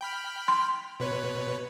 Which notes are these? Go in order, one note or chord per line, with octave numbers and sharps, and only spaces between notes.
G5 B5 F6
C6
B2 B4 C#5